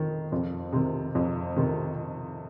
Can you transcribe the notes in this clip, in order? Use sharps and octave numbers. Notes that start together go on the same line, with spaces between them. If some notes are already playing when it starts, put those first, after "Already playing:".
Already playing: F2 D#3
F2
C3 D#3
F2
C3 D#3